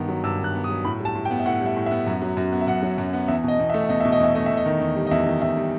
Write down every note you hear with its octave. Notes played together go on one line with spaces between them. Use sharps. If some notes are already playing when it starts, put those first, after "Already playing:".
Already playing: G2 D#3 B3
F#3
G2 E6
D#3 F#6
B3
D#6
F#3
A2 B5
G3
A5
A2
G5
B3
E5
A2 F#5
G3
E5
A2
B3 E5
F#2
F#3
F#2
B3
E5
F#2 F#5
F#3
F#2
B3
E2 E5
B2 D#5
E2
E5
A3
E2 D#5
B2 E5
D#5
E2 E5
A3 D#5
E2 E5
D#5
D#3
E2
G3
D#5
E2 E5
D#3
E2 E5
G3